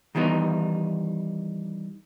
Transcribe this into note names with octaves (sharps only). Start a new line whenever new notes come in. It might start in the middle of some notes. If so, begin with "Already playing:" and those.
D#3 E3 G3 B3 D#4